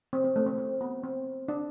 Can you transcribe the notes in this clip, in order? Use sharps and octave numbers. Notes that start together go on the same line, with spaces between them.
C4
C4
A3
C4
C4
B3
C4
D4